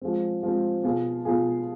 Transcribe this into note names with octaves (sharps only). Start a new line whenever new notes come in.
F3 G#3 C4
F3 G#3 C4
B2 B3 F4 G#4
B2 B3 F4 G#4